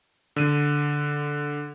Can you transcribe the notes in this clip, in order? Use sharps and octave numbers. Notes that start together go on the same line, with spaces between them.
D3 D#7